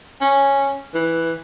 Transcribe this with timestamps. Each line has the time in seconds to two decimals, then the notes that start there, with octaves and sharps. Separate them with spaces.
0.21 C#4
0.95 E3